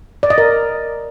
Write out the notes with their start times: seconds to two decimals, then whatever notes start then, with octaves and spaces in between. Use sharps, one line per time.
0.23 D5
0.30 D#5
0.38 A#4